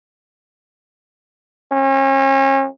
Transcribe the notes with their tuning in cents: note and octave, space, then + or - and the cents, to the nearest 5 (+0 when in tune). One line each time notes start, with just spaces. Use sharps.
C#4 -40